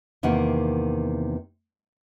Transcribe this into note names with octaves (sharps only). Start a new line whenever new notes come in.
E2 C3 D#3 A#3 F#5